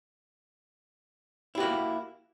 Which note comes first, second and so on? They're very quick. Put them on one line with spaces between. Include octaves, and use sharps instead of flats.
E4 G4 F#4 A#3